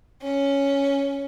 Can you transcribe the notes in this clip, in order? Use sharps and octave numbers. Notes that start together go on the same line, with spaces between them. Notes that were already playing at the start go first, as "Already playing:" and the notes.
C#4